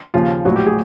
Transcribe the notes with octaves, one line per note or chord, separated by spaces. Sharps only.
D#2 C#3 F3 F4
A#1 A2 F#3 F#4
G4
G#4